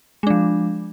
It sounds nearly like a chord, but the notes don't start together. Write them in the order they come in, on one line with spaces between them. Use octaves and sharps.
G#3 D4 F3